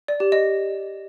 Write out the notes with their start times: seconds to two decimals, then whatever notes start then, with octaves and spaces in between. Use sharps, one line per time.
0.08 D5
0.20 G4
0.32 D#5